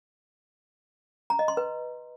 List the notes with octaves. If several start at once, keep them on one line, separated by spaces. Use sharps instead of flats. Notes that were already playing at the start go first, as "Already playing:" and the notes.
A#5
D#5
C6
B4